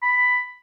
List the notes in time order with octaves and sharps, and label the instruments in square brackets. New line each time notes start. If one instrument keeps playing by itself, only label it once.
[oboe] B5